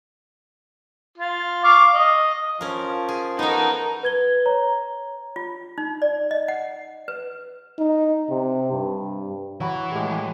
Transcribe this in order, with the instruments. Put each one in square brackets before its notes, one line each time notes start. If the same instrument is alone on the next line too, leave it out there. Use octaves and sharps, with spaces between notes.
[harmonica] F4
F5 C#6 D6
D#5
[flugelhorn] F3 [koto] C#4 A#4
[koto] G#4
[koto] B3 F#4 [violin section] D#4 A4 A#4
[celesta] B4 G#6 G7
C#5 A#5
[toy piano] F4
D#4
D5
D#5
F#5
B4
[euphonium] D#4
C3
G2
[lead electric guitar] E3 [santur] F#3 F#4 B5
[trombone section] A2 G#3 G4